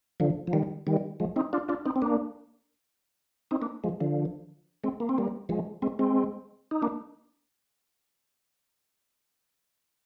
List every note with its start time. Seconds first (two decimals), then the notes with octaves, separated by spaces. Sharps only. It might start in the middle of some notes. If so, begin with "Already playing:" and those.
0.20 D3 F3
0.47 F3
0.53 D#3 G3
0.87 D#3 G3
1.20 F3 G#3
1.36 C4 D#4
1.53 D4 F4
1.68 D4 F4
1.85 C4 D#4
1.96 C4
2.02 A#3 D4
3.51 C4 D#4
3.62 A#3 D4
3.84 F3 G#3
4.00 D3 F3
4.84 G#3 C4
5.00 A#3
5.09 C4
5.18 G3 A#3
5.49 F3 G#3
5.82 G#3 C4
5.99 G#3 C4
6.71 D#4
6.82 A#3 D4